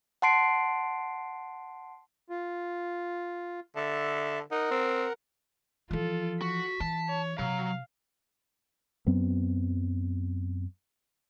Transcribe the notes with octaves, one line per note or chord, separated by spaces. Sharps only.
F#5 A5 C6 C7 D7
F4
D3 E5 A5
D#4 A#4 F#5 A#5
C4
E3 F3 F4 A4
F#4 B6
E3 A5
C#5
C3 F#3 F5
F#2 F#3 B3 C4